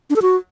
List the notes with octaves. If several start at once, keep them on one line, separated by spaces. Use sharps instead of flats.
D4
A4
F#4